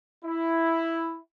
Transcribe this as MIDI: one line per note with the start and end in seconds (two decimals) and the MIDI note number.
0.25 1.19 64